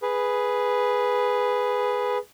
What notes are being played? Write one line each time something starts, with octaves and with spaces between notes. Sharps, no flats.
G#4 B4